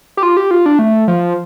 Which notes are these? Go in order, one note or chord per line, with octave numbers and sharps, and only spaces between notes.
G4
F4
G4
F4
D4
A3
F3